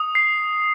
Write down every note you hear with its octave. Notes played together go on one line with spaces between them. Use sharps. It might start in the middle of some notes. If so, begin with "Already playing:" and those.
Already playing: D#6
C7